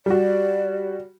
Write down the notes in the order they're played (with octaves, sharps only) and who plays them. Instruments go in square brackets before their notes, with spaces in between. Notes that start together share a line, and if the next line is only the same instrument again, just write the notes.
[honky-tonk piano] G3 F#4 [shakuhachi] D5